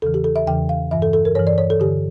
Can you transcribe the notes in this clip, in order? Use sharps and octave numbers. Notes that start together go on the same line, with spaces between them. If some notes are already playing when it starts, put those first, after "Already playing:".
E2 C#3 E3 A4
G4
A4
E5
E2 C#3 E3 G5
F5
G2 E3 E5
A4
A4
A#4
G2 E3 C#5
D5
C#5
A4
G2 D3 G4